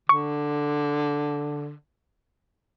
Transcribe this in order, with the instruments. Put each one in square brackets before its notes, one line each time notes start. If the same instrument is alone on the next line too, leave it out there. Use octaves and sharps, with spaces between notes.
[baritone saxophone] D3 [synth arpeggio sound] C#6